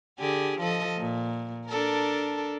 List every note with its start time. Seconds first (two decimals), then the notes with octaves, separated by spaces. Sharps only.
0.19 D3 G4 G#4
0.59 F3 A4 D#5
0.97 A#2
1.67 D4 A4 A#4